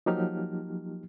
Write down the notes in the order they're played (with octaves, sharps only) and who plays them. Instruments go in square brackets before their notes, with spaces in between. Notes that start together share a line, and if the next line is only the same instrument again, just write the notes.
[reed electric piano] F3 F#3 A#3 D#4 G4 F6